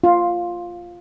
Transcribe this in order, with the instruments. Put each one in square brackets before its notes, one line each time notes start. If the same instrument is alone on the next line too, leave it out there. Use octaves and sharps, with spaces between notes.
[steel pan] F4